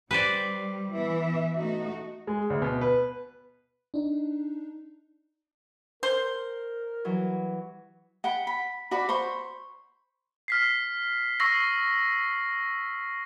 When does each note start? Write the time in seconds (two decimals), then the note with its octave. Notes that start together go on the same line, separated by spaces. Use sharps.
0.11 G3 B4 C5 D5
0.94 E3 B3 E5
1.55 A3 D#4 F#4
2.27 G#3
2.50 D2
2.62 B2
2.81 B4
3.94 D4 D#4
6.03 A#4 C5
7.04 E3 F#3 G3
8.24 F#5 G5 B5
8.47 B5
8.91 F#4 D5 B5
9.09 C5 B5 C#6
10.48 F6 B6 C7
11.40 C#6 E6 A#6 C7